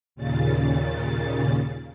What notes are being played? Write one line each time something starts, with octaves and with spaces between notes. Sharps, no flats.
D#2 A#2 C#3 A6